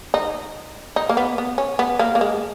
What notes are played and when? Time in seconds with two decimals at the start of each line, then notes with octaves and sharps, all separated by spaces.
0.14 D#4
0.96 D#4
1.09 A#3
1.17 B3
1.38 B3
1.58 C#4
1.79 B3
1.99 A#3
2.15 A#3
2.21 G#3